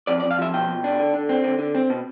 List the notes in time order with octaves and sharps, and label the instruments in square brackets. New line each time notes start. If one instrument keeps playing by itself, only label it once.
[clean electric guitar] F2 D5
D5
F2
F5
F3 E5
B2 G5
B2
D4
D3
D3
C4
D3
D3
C4
B2